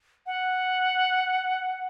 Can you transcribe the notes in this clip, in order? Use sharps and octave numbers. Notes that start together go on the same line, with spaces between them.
F#5